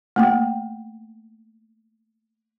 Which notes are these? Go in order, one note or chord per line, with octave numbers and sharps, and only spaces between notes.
A3 A#3 G5